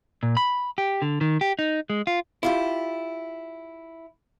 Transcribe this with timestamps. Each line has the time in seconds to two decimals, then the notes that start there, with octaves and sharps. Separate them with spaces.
0.23 A#2
0.37 B5
0.78 G4
1.02 D3
1.21 D#3
1.41 G4
1.59 D#4
1.90 G#3
2.07 F4
2.43 E4 F4 G4